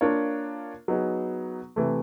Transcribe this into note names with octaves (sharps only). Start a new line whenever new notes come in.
A#3 D4 F4 A#4 C#5
F#3 B3 D#4 G#4
C3 E3 A3